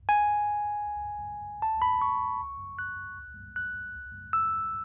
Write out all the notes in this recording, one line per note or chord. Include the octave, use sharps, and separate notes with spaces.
G#5
A5
B5
C#6
F#6
F#6
E6